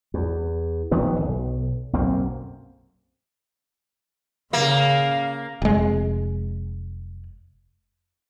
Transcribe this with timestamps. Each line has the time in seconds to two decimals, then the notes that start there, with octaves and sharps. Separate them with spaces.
0.14 E2
0.91 D1 D#3 F3 B3
1.20 B1
1.93 B1 F#2 A#3 C4
4.53 C#3 A#3 F5
5.62 F1 G#3